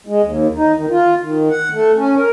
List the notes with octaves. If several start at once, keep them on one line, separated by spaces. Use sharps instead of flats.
G#3
D#2
D#4
D#3
F4
D#3
F#5
A3
C#4
A#4